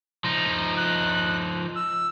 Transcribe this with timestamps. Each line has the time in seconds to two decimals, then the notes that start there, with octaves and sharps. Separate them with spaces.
0.24 F3 D#4
0.77 F#6
1.76 E6